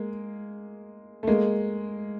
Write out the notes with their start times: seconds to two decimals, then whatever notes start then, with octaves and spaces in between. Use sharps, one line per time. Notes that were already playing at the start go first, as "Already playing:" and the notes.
Already playing: G#3 A#3
1.23 A3
1.27 G#3 A#3